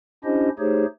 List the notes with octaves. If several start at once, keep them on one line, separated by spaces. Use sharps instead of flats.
C#4 D4 E4 G4 C5 D#5
A3 D#4 G4 G#4 C5 C#5